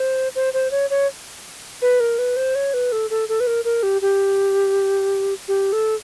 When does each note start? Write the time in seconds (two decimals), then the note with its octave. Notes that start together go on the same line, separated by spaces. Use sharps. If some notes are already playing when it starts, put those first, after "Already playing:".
Already playing: C5
0.35 C5
0.54 C5
0.71 C#5
0.90 C#5
1.82 B4
2.00 A#4
2.18 B4
2.36 C5
2.55 C#5
2.74 B4
2.92 A4
3.10 A4
3.29 A4
3.40 B4
3.47 A#4
3.65 A#4
3.83 G4
4.02 G4
5.48 G4
5.73 A4